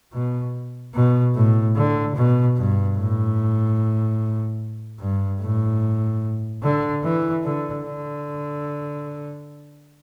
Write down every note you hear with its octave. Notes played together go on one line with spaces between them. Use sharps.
B2
B2
A2
D3
B2
G2
A2
G2
A2
D3
E3
D3
D3